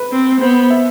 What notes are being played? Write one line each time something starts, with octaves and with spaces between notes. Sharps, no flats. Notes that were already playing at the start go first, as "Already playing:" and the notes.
Already playing: B4
C4
B3 C5
E5